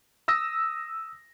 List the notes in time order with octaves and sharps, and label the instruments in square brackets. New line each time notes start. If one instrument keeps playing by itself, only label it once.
[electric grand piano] D#6 E6 A#6